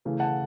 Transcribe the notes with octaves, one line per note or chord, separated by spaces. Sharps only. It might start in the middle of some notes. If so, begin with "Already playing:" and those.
C#3 E3 A3
F#5 A5